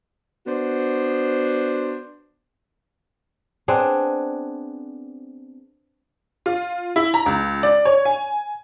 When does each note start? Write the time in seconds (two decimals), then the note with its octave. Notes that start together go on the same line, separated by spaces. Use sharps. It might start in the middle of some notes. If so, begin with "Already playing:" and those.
0.46 B3 D4 F#4 C5
3.68 B3 C4 D4 G#4
6.46 F4
6.96 E4
7.14 A#5
7.26 C#2
7.63 D5
7.85 C#5
8.05 G#5